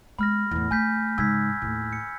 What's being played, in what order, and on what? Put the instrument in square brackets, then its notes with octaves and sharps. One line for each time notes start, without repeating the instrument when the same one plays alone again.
[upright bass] G#3 B3 [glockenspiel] B5 F6 A#6
[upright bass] E2 A2
[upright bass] A3 [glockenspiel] G#5 G6 B6
[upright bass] G#2 C#3 [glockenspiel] E6 G#6 B6
[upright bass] D#2 A2
[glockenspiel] C#7